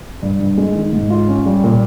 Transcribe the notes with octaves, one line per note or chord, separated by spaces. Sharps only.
G2
G2
G#3
D#3
G#2
F4
C#4
G3
A#2